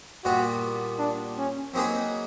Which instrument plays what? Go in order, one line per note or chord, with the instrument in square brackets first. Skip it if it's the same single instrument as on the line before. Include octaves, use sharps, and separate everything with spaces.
[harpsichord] A#2 G3 B3 [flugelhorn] F#4
[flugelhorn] D4
C#4
[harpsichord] F#3 A#3 D#4 G#4 B4 [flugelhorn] C4